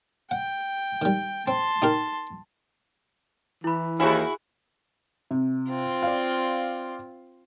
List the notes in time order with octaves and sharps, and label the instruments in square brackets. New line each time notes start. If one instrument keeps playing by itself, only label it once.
[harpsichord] F#5 [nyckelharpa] G5
[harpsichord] D#3 G3
[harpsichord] C4 [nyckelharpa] A5 C6
[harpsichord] D#4 G4 A#4
[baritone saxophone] E3 [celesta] E4 B5
[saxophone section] D#2 [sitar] E4 F#4 [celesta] G#4 G#5
[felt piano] C3
[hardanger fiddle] C4 F4
[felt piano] D5 F5